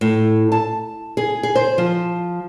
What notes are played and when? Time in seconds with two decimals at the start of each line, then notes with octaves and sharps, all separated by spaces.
0.01 A2
0.52 A5
1.17 G#4
1.43 G#4
1.55 C5
1.78 F3